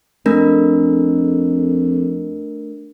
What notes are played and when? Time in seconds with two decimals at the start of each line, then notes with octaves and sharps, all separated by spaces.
0.26 F2 A3 D4 A#4